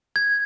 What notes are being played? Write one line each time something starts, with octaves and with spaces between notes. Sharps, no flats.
G#6